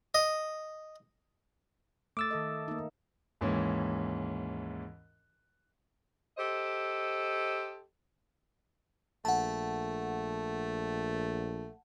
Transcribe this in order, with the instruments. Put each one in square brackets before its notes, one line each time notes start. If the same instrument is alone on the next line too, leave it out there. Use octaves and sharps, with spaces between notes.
[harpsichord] D#5
[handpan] A3 [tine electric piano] D6 E6 A6
[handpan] D#3 A4 D#5
A#3 D#4
[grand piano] D#2 G#2 E3 C#4
[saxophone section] G4 A4 C5 D#5
[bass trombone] A#1 [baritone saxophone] A3 [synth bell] F#5 A5